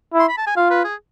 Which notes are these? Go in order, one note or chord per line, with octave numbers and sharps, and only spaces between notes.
E4
C6
B5
A5
G#5
F4 F5
B4
G#4